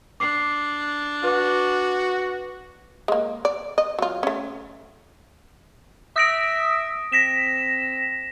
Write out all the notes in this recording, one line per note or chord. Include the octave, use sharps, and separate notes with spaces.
D4 D6 C7
F#4 B4 D6
G#3 A#3
D5
D#5
F#3 F4
A3 C#4
E5 D#6 A#6 D7
C4 A#6 B6 E7